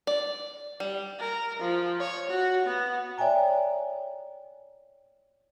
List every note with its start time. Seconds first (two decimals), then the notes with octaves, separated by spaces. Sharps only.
0.07 D5
0.80 G3
1.19 A#4
1.60 F3
2.00 C#5
2.30 F#4
2.66 B3
3.18 C#5 D5 E5 G5 G#5 A#5